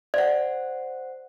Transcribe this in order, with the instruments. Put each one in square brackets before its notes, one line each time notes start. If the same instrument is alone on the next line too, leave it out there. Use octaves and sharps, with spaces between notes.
[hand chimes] C5 F#5 [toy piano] D5